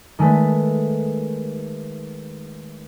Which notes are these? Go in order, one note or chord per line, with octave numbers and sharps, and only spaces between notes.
D#3 G#3 A3 B4